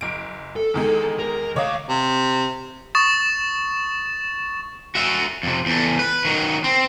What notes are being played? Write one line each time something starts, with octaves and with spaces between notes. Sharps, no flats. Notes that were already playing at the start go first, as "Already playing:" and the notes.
F#1 D7
A4
E2 D#3 G#3
A#4
D2 C#5 D#5 F5 D6
C3
C#6 D#6 A6 E7
F#4 E5
F2 C3
E2 A3
B4
D#3 F#3
C4